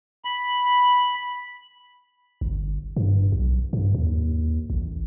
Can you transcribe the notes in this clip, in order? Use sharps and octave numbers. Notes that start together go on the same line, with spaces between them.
B5
G1
G2
B1
G2
D#2
A1